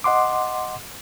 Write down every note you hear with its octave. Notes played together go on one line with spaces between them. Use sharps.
D#5 F#5 C6 D6